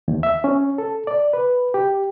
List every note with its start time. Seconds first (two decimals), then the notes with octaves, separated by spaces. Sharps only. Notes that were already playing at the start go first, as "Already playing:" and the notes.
0.08 D#2
0.23 E5
0.44 C#4
0.78 A4
1.07 D5
1.33 B4
1.74 G4